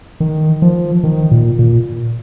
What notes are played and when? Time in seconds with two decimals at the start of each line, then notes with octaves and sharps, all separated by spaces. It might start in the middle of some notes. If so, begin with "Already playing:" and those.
0.20 D#3
0.62 F3
1.04 D#3
1.31 A#2
1.59 A#2